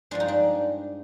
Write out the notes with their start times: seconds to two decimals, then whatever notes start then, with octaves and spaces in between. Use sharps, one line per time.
0.11 G2 F3 G#3 D4
0.20 D#4
0.28 D4